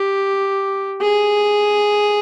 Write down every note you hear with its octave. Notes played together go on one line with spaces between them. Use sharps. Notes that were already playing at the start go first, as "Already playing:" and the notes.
Already playing: G4
G#4